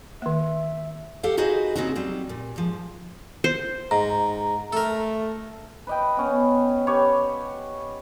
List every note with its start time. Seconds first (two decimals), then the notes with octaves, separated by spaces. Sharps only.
0.22 D#3 A#3 E5
1.23 G4 A4 F5 F#5
1.37 D#4 F#4 G#4 B4 C5 D#5
1.76 C#3 A#3 C4 D#4 F#4
1.95 F#3 G3 C4
2.29 A#2
2.56 G#2 F3
3.44 C5
3.91 G#2 A#5
4.73 A3 A4 A#4
5.87 B4 D#5 G5
6.17 B3 C#4
6.87 G4 B4 C#5